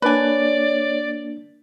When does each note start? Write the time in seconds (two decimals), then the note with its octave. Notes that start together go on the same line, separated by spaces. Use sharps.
0.02 A#3 D4 B4 C#5 D5 G#5